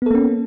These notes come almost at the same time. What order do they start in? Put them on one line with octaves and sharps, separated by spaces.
B3 A4 A#3 C#4